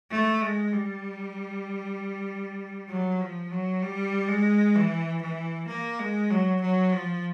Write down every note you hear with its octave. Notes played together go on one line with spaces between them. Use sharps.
A3
G#3
G3
F#3
F3
F#3
G3
G#3
E3
E3
A#3
G#3
F#3
F#3
F3